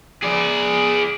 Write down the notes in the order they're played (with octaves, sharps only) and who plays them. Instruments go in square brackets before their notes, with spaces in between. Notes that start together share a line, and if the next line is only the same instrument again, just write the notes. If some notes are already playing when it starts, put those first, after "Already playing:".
[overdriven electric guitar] G#4 D5